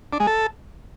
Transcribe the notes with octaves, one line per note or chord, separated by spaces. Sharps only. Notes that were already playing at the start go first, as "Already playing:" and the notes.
D4
G#3
A4